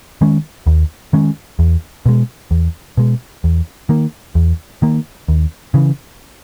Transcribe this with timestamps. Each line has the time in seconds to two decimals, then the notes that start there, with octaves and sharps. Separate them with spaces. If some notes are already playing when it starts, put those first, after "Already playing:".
0.21 D#3 G#3 C#4
0.67 D#2
1.13 D#3 G#3 C#4
1.59 E2
2.06 B2 G#3
2.51 E2
2.97 B2 G#3
3.44 E2
3.89 D#3 A#3
4.35 E2
4.82 D#3 A#3
5.28 D#2
5.74 C#3 E3